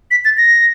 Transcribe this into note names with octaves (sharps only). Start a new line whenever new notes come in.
B6
A6
A#6